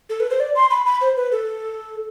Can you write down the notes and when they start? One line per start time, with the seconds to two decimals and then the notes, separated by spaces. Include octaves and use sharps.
0.10 A4
0.20 B4
0.30 C5
0.40 D5
0.56 C6
0.71 B5
0.86 B5
1.01 C5
1.17 B4
1.32 A4